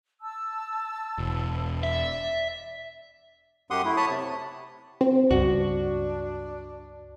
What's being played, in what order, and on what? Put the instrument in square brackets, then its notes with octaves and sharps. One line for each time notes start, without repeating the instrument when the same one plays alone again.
[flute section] A5 E6
[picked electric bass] E1
[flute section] D5 [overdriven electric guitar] E5
[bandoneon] F#2 G4 F#5 C6 D#6
A3 E4
C#5 A5 B5 D#6
C3
[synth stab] C4
[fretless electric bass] C#2 G2 [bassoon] D4 [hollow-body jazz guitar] F#4